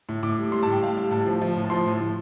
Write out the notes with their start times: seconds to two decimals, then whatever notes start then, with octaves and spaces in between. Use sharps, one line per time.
0.09 A2
0.23 A2 D6
0.39 G3
0.52 G3 C6
0.63 A5
0.67 A2 G5
0.83 G3 F5
0.97 G3
1.11 A2 A5
1.26 F3
1.42 F3
1.56 A2
1.64 A5
1.70 F3 C6
1.86 A2
2.00 A2